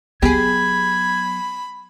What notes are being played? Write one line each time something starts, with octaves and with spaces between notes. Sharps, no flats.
F#3 B3 G4 G#4 B5 G#6